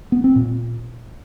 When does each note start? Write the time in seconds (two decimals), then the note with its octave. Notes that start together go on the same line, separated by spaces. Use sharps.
0.12 B3
0.24 C4
0.36 A#2